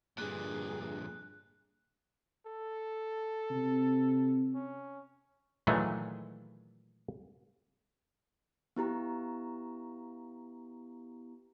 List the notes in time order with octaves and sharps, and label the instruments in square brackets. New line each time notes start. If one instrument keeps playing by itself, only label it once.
[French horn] G2 [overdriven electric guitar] A#2 D3 [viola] G#4 [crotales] F#6
[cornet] A4
[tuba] C3
[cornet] C#4
[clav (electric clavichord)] A#2 D#3 E3 F#3 G#3 A3
[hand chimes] B3 E4 G4 A#5